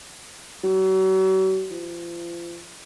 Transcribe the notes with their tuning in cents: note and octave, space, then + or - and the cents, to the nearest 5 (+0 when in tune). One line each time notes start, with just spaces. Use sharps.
F#3 +40
F3 -35